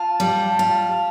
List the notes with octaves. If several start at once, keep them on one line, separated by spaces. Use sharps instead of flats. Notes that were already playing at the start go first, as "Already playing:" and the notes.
Already playing: F4 A5
G3
F4